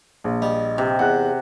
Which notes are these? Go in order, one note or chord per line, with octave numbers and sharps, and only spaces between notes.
A#1
G3 D#5
C3
E2 F#5 F#6